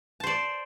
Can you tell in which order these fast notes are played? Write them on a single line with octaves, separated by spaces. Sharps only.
A5 C5 D5